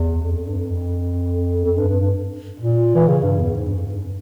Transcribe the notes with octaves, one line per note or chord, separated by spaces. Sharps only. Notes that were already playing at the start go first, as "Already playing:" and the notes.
Already playing: E2
F2
F2
G2
F2
F2
G2
G2
G2
A#2
E3
C#3
G2
E2
G#2
G2
F2
G2